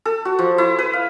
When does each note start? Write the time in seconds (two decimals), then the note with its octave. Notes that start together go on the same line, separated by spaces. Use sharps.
0.06 A4
0.25 F#4
0.39 F3
0.58 E4
0.79 B4
0.93 F5